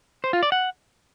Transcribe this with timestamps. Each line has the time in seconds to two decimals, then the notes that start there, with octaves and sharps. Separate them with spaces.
0.24 C5
0.33 F4
0.43 D5
0.52 F#5